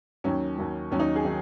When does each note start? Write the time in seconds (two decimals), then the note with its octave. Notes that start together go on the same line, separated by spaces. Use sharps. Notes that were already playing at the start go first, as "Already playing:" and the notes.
0.24 D#2 D#3 F#3 C#4
0.58 D#2 D#3 F#3
0.91 D#2 D#3 F#3 C#4
1.00 D#4
1.16 G#4
1.24 D#3 F#3